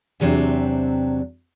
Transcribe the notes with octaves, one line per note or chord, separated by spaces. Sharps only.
E2 C3 F#3 C4 D4